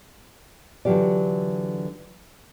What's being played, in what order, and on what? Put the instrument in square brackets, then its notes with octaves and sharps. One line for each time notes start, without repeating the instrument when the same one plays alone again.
[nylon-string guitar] D3 E3 F#3 F4 G4 D5